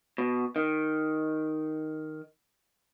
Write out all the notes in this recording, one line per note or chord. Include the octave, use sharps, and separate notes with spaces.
B2
D#3